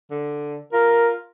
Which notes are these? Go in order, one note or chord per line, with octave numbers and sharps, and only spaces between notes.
D3
F4 A#4